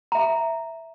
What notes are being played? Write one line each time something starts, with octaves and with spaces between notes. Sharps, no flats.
E5 A#5